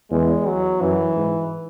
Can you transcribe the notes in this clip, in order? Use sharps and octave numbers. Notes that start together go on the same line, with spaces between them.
E2 G#3
F#3
F#2 E3
G#2